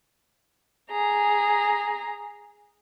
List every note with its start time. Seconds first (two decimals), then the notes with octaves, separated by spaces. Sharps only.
0.91 G#4 A#5